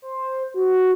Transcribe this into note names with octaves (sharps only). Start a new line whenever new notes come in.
C5
F#4